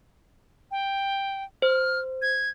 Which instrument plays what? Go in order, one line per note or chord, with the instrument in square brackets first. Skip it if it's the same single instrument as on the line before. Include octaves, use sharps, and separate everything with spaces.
[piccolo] G5
[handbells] C5 [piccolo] F6
[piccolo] G#6